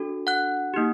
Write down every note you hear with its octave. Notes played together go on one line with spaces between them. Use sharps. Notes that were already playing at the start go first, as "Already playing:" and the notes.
Already playing: D4 F#4 A4
F#5 F#6
A#3 D#4 G4